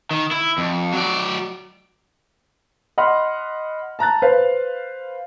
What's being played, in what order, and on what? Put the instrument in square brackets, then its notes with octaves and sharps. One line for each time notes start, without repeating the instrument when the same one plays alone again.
[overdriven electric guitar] D#3
E4
F2
F#3 D5
[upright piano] D#5 F#5 B5 C6 F6
A5 A#5 F#6 A6
B4 C5 F5